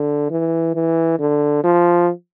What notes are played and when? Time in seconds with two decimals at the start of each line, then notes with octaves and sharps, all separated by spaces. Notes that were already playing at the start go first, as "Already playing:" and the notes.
Already playing: D3
0.30 E3
0.75 E3
1.20 D3
1.64 F3